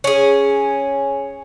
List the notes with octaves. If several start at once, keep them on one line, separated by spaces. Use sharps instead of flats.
C#4 G#4